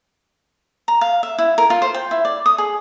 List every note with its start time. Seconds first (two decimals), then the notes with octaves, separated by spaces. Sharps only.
0.88 A#5
1.01 F5
1.23 E5
1.38 E4
1.58 A#4
1.70 F4
1.82 C5
1.94 G5
2.11 E4
2.25 D5
2.46 D#6
2.58 G#4